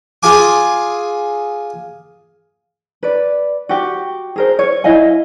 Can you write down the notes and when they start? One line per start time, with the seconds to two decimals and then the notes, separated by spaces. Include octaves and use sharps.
0.23 F4 G#4 G#5 D6
3.03 B4 D5
3.69 F#4 G4
4.36 G#4 A#4 C5
4.59 C#5
4.84 E4 D#5 F5 G#5